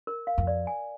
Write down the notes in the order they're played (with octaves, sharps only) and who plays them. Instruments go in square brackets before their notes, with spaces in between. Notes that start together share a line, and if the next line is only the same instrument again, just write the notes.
[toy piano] A#4
F5
[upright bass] F2
[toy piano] D5
G#5